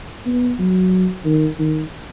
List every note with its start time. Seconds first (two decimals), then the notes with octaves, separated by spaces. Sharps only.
0.26 B3
0.59 F#3
1.25 D#3
1.59 D#3